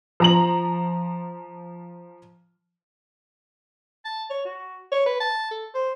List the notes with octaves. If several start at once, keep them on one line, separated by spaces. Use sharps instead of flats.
F3 A#5 F#7
A5
C#5
F#4
C#5
B4
A5
A4
C5